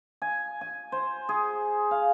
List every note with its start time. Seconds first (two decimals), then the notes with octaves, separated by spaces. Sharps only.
0.22 G#5
0.61 G#5
0.92 C5
1.29 G#4
1.91 F5